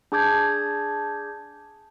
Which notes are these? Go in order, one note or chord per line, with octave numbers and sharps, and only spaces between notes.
D4 G#4 A5 D6 G6 G#6